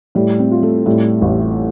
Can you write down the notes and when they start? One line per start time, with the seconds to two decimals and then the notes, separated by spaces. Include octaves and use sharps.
0.15 A2 G3
0.39 C4
0.51 F4
0.63 A3
0.86 A2 G3
1.22 A1